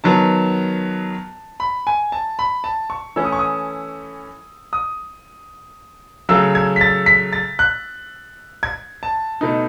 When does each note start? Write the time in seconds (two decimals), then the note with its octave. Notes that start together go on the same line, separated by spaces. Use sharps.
0.04 D#3 F#3 B3 A5
1.60 B5
1.87 G#5
2.12 A5
2.39 B5
2.64 A5
2.90 C#6
3.16 E3 A3 C#4 E6
3.25 D#6
3.32 C#6
3.39 D#6
4.73 D#6
6.29 C#3 F#3 A3 E6
6.55 G#6
6.76 B6
6.81 A6
7.06 B6
7.33 A6
7.59 F#6
8.63 G#6
9.03 A5
9.41 B2 A3 D#4